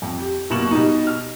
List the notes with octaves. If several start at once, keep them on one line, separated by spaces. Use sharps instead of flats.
F2
G4
F#1 B2 A#3 C#6 E7 F#7
B2 G3 D#4
F6